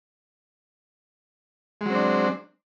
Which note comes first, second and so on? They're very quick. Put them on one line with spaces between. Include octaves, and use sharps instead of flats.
G#3 F#3 C4 D4